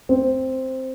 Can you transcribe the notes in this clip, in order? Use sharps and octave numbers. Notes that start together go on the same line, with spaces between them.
C4